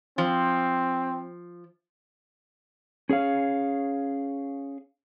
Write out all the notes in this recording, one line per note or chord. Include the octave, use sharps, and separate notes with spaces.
F3 C4
C#4 G#4 C#5 F5